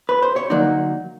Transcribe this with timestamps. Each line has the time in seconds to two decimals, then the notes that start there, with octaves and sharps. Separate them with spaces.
0.09 B4
0.22 C5
0.36 C#5
0.50 D3 F#3 A#3 D#4 D5